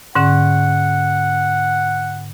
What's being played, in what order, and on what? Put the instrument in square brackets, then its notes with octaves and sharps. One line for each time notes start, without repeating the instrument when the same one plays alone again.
[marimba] G#2 D3 C#4 [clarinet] F#5